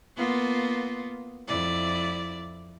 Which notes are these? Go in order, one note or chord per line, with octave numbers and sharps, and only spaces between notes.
A#3 B3 F4
F2 E4 D5